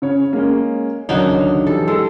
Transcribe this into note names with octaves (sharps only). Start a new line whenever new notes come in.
C#3 C#5
G#3 A#3 C#4
C#2 D3 D#3 F#3 D4 D#4
E3 G3 A4
G#3 G4 A4